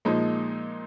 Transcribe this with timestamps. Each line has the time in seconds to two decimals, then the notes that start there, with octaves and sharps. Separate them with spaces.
0.05 A#2 F3 G#3 D#4